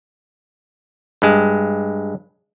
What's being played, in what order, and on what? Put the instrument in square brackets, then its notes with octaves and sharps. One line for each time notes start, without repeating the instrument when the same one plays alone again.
[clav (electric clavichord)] G2 G#3